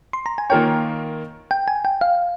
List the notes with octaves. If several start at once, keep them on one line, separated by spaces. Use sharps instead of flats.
C6
A#5
G#5
D#3 A#3 F4 A#4 C#5 G5
G5
G#5
G5
F5